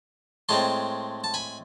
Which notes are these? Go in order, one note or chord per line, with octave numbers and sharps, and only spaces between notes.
A2 G#3 C4 A5 C6
A5
G#5 B5